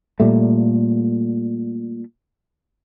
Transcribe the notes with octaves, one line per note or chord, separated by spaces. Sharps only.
A#2 G3 A3